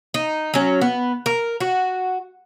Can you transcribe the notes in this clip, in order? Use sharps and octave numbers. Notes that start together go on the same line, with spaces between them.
D#4
F#3 C#4
B3
A#4
F#4